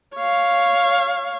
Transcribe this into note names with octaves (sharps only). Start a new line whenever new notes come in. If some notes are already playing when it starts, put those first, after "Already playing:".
C#5 F5